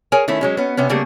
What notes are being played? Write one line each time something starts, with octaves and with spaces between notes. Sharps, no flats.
G#4 A#4 C#5 G#5
D#3 A3 C#4 E4
F#3 G#3 C#4
B3 C#4
C3 B3 C#4
C#3 G3 A3 A#3 G#4